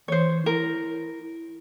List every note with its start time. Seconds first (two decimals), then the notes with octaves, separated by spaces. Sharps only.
0.08 E3 C5 C#5
0.46 E4 A#4